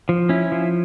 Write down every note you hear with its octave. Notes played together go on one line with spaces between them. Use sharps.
F3
C#4 E4
F3